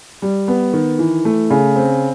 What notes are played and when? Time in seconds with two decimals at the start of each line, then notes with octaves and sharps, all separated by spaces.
0.22 G3
0.48 B3
0.73 D#3
0.99 E3
1.25 A3
1.50 C#3
1.76 C4